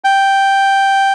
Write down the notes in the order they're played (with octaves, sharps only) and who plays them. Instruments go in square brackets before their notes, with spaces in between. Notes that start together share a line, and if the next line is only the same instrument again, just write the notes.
[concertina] G5